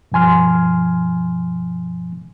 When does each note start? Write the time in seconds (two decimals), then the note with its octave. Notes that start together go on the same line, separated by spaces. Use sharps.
0.12 G2 B2 F3 G#5 C6 F6